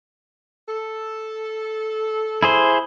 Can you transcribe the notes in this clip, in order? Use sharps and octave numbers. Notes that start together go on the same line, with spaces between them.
A4
E4 G#4 C5